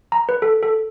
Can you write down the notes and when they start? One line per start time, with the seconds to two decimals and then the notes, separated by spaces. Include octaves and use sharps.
0.12 A#5
0.29 B4
0.42 A4
0.63 A4